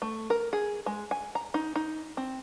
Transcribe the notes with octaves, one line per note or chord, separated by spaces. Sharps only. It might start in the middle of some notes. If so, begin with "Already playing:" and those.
A3
A#4
G#4
G#3
G#5
A#5
D#4
D#4
C4